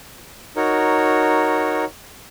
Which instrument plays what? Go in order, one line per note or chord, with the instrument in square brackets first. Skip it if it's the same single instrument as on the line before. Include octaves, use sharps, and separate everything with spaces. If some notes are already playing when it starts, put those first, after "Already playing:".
[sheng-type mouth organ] D#4 F#4 A#4 C#5